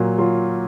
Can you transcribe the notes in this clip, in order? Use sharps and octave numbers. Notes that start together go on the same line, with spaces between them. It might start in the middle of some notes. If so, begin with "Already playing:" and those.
Already playing: A#2 F#3
F#3 F4